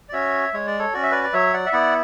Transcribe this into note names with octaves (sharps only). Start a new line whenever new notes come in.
D5
C#4 F#4 C#5 E5
G#3 C#5
D5
A4 C#5
C#4 F#4 D5
E5
B4 D5
D5
F#3 C#5 E5
D5 F#5
E5
B3 E4 D5 F#5